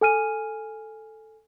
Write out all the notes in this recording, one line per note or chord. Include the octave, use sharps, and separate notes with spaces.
A4 G#5 F6 D#7